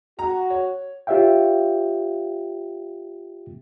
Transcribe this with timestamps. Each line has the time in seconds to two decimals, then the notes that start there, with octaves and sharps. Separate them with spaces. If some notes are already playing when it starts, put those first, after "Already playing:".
0.19 F#4 A#5
0.50 C#5
1.07 F4 G4 C#5 E5 F5 G5